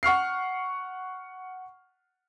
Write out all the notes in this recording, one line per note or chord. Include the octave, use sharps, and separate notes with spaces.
F#5 C#6 F6 C7